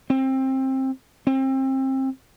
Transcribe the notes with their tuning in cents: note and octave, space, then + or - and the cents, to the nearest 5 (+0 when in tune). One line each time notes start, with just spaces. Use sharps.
C4 +20
C4 +30